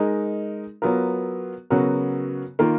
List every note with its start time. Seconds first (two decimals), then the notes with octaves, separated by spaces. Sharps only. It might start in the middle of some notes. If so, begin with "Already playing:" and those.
Already playing: G#3 D#4 A#4
0.82 F#3 B3 F4 A#4
1.70 C#3 F#3 B3 F#4 A#4
2.59 D#3 A#3 F4 A#4